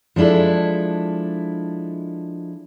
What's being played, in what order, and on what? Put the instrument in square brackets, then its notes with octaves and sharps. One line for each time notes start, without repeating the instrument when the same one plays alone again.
[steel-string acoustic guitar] F3 G#3 D4 E4 A4